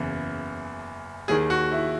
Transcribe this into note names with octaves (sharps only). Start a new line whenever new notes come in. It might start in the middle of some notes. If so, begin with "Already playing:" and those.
Already playing: F#1 E2 C#3 E3
D#2 D#3 G#4
F#4
E4